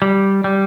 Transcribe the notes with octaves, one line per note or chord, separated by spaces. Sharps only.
G3
G3